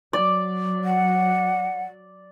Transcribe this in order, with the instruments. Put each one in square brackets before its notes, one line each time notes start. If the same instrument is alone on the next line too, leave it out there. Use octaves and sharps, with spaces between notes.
[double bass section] F#3 [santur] D5
[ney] F#5